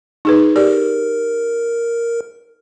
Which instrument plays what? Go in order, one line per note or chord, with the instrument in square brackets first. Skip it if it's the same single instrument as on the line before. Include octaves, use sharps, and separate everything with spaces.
[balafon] D#4 G#4 B4
[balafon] G4 D5 [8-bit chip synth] A#4